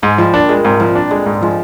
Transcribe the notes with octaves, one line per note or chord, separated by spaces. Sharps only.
G#2 G#3
F3 G3
A#2 D4
A#2 G#3
G#2 C3
A#2 F3
D4
D3 G#3
G#2
F3 G#3